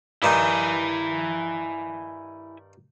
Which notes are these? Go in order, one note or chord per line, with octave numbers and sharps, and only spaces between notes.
G2 D#3 D#4 E4 G#5